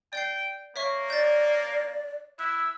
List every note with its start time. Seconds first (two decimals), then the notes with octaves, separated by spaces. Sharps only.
0.13 D5 G5 G6 C7
0.76 A#3 C#5 E5 C#6
1.10 D5 G6 A6
2.39 E4 E6 F#6